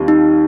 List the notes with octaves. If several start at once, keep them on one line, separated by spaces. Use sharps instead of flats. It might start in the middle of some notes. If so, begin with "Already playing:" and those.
Already playing: D#2 D#3 G3 C4 F4
D#4